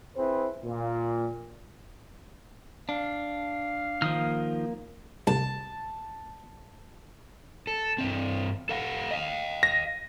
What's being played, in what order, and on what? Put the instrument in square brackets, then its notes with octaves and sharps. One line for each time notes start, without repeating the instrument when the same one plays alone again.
[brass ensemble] C4 E4 G#4 B4 C5
A#2
[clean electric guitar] D4 [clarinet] F5
[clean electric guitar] D#3 F3 [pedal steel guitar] A#3 D#6 F6
[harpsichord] C2 [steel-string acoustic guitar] A5
[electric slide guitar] A4
G2 A#2 C4
A4 F5 F#5
D#5 F5
[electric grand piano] A#6